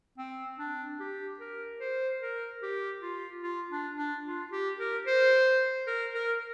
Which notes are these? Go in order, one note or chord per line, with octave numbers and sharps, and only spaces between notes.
C4
D4
G4
A#4
C5
A#4
G4
F4
F4
D4
D4
F4
G4
A#4
C5
A#4
A#4